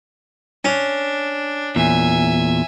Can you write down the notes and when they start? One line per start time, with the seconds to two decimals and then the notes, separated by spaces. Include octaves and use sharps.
0.65 C#4 D4
1.76 E2 A#2 E5 G#5